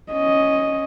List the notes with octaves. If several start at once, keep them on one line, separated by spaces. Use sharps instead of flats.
C#4 D#5